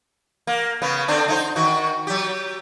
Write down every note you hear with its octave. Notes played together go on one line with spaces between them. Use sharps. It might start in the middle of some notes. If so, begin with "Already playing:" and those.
A#3
C#3 B3
D3 C4 D4
D#4 E4 C5
D#3 F#4
F#3 G4